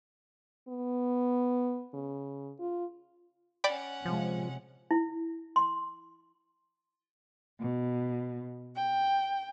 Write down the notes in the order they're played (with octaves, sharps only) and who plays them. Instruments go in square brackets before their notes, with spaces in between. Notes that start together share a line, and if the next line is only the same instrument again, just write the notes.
[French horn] B3
C#3
F4
[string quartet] C#4 F#5 [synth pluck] D5 G5 B5
[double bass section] C3 G#3 [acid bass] F3
[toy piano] E4
C6
[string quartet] B2
G5